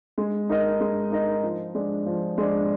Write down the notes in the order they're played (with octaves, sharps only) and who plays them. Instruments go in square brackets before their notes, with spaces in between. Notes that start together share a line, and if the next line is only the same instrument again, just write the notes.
[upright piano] G#3
D#4 A#4 D#5
G#3
D#4 A#4 D#5
F3
G#3 D4
F3
G#3 D4